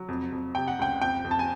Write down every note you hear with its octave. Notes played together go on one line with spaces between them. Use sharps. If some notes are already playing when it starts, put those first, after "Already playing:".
Already playing: F#3
F2
F2
C3 G5
F#5
C#2 G5
F2 G5
F2
A5
G#5